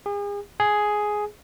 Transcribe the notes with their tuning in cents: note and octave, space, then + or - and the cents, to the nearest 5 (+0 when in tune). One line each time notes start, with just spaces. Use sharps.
G#4 -40
G#4 +5